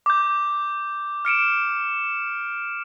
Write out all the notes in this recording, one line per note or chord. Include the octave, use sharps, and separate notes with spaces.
D6 G6
F6 C#7 D7 E7